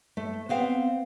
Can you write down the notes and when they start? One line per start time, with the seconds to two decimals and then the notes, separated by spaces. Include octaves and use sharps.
0.17 A3
0.49 B3 C4 F5 F#5